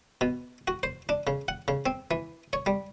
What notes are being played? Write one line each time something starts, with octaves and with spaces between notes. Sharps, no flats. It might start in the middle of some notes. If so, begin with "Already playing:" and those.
B2
F#4
C5
D4
C#3
F#5
C#3
C4
E3
C#5
G3